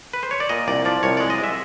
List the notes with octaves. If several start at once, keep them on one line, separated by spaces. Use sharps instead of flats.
B4
C5
C#5
D5
A#2 D#5
C2 D5
F3 D5
C2 C#5
G#3 D5
D#5
G#3
E5